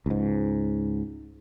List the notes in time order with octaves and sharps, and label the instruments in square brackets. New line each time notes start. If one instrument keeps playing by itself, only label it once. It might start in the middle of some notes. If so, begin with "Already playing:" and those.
[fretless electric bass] C#2 G#2